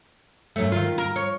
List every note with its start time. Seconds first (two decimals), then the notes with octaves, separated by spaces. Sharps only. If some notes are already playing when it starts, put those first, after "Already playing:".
0.56 F#2 F#3 A3
0.72 D#3 F4
0.98 A#4
1.16 C#5